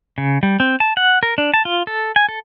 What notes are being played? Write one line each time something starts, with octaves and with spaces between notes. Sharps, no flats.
C#3
G3
C4
A5
F#5
A#4
D4
A5
F4
A4
G#5
A4